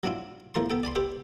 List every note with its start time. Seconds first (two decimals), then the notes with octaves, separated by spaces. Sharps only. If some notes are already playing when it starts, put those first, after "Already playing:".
0.03 F#3 C4 D4 E4 F4
0.54 E2 A2 F3 A#4 A5 C6
0.70 B3 A4 G5
0.83 D5 G#5 B5 C6
0.95 G4 B4 C5 E5 G5